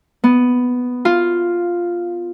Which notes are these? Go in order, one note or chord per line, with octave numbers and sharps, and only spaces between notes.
B3
F4